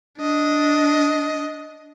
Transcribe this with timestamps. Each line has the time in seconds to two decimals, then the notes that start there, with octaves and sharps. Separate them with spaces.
0.20 D4 D#5